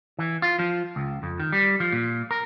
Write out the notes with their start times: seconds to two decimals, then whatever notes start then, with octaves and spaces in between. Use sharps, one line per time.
0.19 E3
0.42 F4
0.59 F3
0.96 C#2
1.23 F2
1.40 D#3
1.52 G3
1.80 F3
1.92 A#2
2.31 A#4